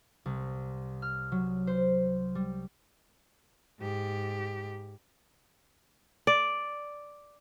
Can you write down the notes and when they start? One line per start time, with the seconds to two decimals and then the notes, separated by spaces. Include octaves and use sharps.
0.26 C2
1.02 F6
1.32 F#3
1.67 C5
2.35 G3
3.80 G#2 G4
6.27 D5